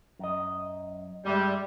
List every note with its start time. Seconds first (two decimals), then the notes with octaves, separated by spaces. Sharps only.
0.19 F#2 D#5
1.25 G2 G3 G#3 E5